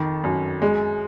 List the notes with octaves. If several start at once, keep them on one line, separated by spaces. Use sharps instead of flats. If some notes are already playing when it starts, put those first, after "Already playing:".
Already playing: F2 D#3
F#2
G#3